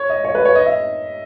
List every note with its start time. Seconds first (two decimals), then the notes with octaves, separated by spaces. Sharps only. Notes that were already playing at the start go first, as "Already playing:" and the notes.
Already playing: C#5
0.10 D#5
0.25 C#5
0.35 B4
0.45 C#5
0.55 D#5
0.66 E5